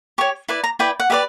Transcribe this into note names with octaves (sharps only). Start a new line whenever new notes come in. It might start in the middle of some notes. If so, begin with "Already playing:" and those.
G4 C#5 C#6
E4 B4 D5
A#5
E4 B4 D5 G5
F#5
G4 B4 D5 E5